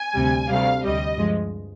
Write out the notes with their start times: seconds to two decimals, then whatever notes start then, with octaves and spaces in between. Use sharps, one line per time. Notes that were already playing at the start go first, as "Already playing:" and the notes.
Already playing: G#5
0.15 D2 C3 G3
0.48 D2 C3 G3 F5
0.83 D2 C3 G3 D#5
1.17 G2 F3 G#3